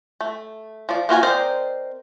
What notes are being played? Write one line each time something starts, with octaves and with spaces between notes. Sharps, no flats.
A3
F3 D5
A#3 F4 F#4 G#5
C4 A#4 C5 D5 D#5